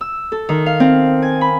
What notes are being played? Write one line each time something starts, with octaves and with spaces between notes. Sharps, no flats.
E6
A4
D#3
F5
C4
G#5
B5